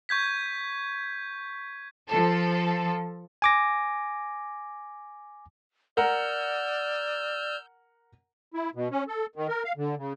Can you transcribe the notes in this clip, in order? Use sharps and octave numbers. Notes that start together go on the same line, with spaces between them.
C#6 G6 G#6 B6
F3 A4
G#5 D6 A#6
A#4 D5 F#5 A#5 E6 F6 G6
E4
B2
C#4
A4
D#3
A#4
F5
D3
C#3